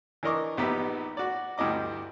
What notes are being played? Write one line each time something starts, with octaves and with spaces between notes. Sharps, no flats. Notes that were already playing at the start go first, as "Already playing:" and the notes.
E3 D4 A#4 D#5 C#6 D6
A#1 B3 D#4 G4 E5 B5
F#4 D5
D2 G2 E4 D#5 D6